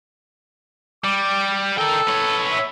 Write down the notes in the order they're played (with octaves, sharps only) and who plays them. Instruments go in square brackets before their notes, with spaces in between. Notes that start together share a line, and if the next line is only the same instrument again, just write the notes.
[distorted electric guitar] G3 [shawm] D6
[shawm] A4 [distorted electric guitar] A#4 G5
[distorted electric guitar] B3 C#5
[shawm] E5